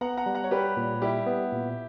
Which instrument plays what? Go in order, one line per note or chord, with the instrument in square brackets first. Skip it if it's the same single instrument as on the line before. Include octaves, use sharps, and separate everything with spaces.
[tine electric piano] B3 [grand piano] F#5 A#5
[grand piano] F#5 A#5
[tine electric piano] G3
[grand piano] F#5 A#5
C#5
[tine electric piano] G3 [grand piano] G4 B4
[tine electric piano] A#2
[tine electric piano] G3 [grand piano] E4 G4
[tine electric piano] B3
A#2